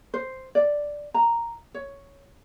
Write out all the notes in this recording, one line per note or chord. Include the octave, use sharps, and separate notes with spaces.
C5
D5
A#5
C#5